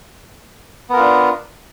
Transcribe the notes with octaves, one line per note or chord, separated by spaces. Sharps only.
B3 D4 F4 A#4